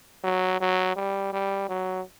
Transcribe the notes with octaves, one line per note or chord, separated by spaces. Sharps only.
F#3
F#3
G3
G3
F#3